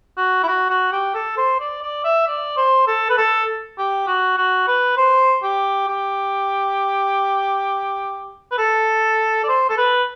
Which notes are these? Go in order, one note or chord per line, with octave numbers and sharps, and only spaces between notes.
F#4
E4
F#4
F#4
G4
A4
C5
D5
D5
E5
D5
C5
A4
B4
A4
G4
F#4
F#4
B4
C5
G4
G4
B4
A4
D5
C5
A4
B4